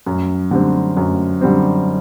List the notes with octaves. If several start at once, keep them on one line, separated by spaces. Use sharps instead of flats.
F#2
D3 G3 C4
F#2
D3 G3 C4